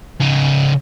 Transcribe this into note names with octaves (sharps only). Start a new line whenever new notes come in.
C#3 D#4